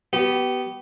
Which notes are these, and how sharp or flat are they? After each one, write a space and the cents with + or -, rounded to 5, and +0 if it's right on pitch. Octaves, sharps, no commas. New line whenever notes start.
B3 +0 G4 -30